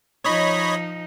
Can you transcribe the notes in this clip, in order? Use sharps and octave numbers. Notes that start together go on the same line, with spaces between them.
F3 D#4 C#5 D#5 B5